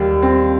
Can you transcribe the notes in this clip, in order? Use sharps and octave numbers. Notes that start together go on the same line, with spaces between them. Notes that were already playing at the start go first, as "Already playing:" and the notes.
Already playing: D#2 G3
C4